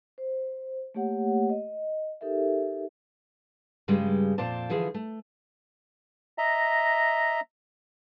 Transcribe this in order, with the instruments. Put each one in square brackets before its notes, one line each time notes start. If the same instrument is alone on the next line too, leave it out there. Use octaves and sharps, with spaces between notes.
[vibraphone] C5
A3 A#3 G4 C#5 F#5
D#5
D#4 G4 A4 A#4 E5
[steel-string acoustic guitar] G2 C#3 G3 G#3
F2 A#2 C5 D5 A5
D3 E3 F3 G#4
A3
[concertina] D#5 E5 A#5